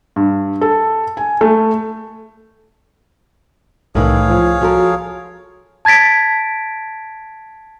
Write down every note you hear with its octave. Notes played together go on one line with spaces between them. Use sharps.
G2
A4
G#5
A3
C2 A2 D#3 E3 A3 G#4 C#5 F5
F3
F3 F#4 A4 A#4
A5 G#6 A6 B6 D7